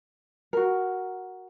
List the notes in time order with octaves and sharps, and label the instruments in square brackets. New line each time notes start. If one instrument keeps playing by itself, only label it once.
[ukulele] F#4 A#4